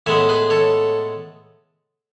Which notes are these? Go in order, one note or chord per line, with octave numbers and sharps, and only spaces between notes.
A2 G#3 B3 C#5 E5
G#4 B4
A4 C#5